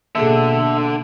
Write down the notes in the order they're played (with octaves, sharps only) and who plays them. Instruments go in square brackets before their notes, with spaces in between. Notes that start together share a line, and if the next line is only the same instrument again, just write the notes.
[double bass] B2 [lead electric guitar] D3 [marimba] A#3 G#4 A4 [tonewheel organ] E5